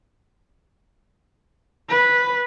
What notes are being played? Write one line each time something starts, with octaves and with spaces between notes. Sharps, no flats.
B4